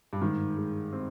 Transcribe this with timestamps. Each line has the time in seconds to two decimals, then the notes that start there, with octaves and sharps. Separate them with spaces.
0.13 G2
0.21 G#2 D#3
0.57 G#3
0.93 C4